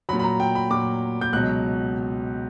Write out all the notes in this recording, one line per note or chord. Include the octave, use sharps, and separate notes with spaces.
A#2 F#3 B5
B5
A#5
G5
B5
A#2 F#3 D6
G6
C#2 B2 F#3 F#6